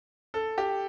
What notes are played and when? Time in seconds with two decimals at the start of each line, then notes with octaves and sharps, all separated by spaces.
0.34 A4
0.58 G4